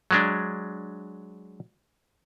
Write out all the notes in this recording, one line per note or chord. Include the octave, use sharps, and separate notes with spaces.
F#3 G#3 D4